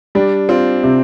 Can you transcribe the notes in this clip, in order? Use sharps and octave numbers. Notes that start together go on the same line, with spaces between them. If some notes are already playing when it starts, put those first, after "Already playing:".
G3 D4
C4 F4
C3